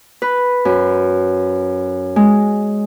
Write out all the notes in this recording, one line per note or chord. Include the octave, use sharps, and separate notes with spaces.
B4
F#2
G#3